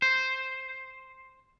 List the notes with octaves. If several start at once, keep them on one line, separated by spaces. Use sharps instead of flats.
C5